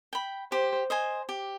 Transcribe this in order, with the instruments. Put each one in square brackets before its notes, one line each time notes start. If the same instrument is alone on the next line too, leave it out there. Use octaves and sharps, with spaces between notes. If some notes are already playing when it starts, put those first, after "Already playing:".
[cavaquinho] G5 B5
[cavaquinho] G4 [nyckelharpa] C5
[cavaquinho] C5 D#5 G#5
G4